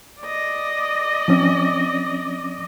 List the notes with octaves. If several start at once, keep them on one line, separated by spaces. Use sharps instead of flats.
D5 D#5
F3 C4 C#4